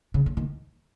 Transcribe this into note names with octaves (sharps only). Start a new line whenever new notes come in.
C#3
D3
D#3